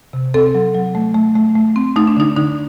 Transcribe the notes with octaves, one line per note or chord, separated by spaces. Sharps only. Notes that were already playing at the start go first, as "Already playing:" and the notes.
C3
C4 A4
F#3
F#3
A3
A3
A3
A3
C4
A3 D#4
D4
D3 D#4
D3 D#4